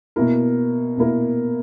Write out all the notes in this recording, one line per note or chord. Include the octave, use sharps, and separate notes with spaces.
B2 A#3 E4 A#4
B2 A#3 E4 A#4